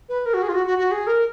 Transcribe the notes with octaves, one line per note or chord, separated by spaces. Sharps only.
B4
A#4
F#4
G#4
F4
F#4
F#4
F#4
G#4
A#4